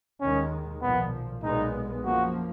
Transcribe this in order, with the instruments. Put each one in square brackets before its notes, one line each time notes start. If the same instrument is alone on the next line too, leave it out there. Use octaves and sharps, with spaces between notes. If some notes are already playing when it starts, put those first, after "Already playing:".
[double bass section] D#2 D#3 G#3 [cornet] C#4
[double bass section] B1 A#2 F3 [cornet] B3
[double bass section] B1 A#2 G#3 B3 [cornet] D#4
[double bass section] F#2 F3 A#3 [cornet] F#4